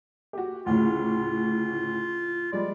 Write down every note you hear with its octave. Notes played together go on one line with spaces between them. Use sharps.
F#4 G4
D2 A2 C#3 F4
F3 G3 G#3 D5